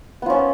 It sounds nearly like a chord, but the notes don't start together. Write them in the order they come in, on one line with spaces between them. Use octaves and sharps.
B3 F3 C#4